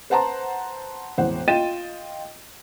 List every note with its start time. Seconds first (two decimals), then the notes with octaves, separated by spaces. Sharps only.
0.10 B4 C5 F#5 A5 A#5 C6
1.18 E1 A1 C5 F#5
1.48 F4 D#5 G5 A6 D#7 E7